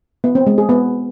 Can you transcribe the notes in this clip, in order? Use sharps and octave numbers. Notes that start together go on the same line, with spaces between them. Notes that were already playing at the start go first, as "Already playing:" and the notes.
B3
C4
G#3
G#4
B3